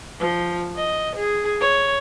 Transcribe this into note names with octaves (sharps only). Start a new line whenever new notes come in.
F3
D#5
G#4
C#5